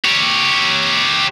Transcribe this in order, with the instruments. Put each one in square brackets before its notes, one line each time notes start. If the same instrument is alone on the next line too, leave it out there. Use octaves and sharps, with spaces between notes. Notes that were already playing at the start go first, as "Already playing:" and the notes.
[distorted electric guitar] G4 C#5